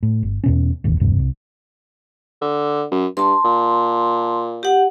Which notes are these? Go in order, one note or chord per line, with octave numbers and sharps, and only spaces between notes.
A2
G1
E2 B2 C#4
E1 A1 D#2
E1 D2 G2 C3
C2
D3
F#2
G2 A5 C6
A#2
G4 F#5